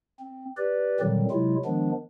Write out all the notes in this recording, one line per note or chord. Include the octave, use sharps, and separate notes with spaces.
C4
G4 B4 D5
A#2 D3 D#3 F#3 G3 C4
C3 F#3 G#3 E4 F4
D#3 F3 G#3 B3 D4